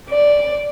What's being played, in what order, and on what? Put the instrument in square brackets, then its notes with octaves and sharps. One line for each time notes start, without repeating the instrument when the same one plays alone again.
[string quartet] D5